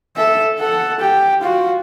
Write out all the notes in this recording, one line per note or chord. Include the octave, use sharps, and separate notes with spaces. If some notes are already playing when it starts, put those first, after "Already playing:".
A4 E5
A4 F#5
G4
F4 F#4